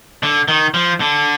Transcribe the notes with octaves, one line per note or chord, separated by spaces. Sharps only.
D3
D#3
F3
D3